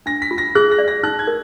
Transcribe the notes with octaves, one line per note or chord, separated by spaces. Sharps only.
D4 A#6
B6
F4
A#6
G#4 F#6
A#6
D5
A#6
D#4 F#6
G#6
A#4